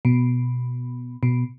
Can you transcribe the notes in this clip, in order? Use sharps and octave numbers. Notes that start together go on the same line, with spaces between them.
B2
B2